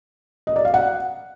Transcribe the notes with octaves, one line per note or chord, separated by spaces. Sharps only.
D#5
D5
F5
F#5